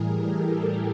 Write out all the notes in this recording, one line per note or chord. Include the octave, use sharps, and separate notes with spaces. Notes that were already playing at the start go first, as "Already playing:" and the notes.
Already playing: A2 E3 G3 G#4 A#4
G4 A4